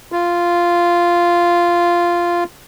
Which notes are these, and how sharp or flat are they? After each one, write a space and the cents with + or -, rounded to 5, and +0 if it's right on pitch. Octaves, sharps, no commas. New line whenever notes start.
F4 -10